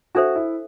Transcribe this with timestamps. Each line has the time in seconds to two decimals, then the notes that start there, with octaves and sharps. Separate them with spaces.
0.15 D4 F#4 A4 C5 E5
0.36 E4